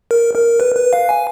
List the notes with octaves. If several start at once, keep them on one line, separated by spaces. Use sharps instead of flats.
A#4
A#4
B4
B4
F5
G#5